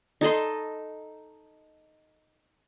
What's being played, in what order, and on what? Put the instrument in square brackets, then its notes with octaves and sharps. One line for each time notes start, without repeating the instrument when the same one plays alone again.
[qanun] D#4 A4 D#5 C6